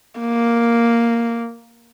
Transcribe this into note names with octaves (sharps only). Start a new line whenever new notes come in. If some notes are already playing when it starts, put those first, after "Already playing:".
A#3